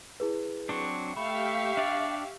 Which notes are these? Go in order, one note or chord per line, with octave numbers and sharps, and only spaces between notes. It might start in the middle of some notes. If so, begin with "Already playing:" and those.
E4 G#4 B4
F#3 C4 D4 C#6
A3 G4 E5 F5 B5 C#6
D4 D5